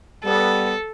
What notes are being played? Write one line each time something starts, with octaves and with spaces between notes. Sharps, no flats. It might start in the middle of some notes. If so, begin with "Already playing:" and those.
G3 B3 A4